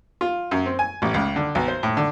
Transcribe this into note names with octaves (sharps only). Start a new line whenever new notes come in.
F4
F#2
C4
G#5
A1
C#2
D3
B1
C5
A2
D3